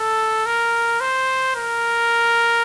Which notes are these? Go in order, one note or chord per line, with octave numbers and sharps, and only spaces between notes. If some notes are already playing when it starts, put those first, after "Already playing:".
Already playing: A4
A#4
C5
A#4